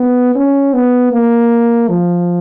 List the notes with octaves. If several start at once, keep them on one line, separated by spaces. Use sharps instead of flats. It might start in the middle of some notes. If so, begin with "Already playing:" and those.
Already playing: B3
C#4
B3
A#3
F3